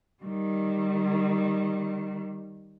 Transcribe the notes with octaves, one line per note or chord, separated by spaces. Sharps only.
D#3 G3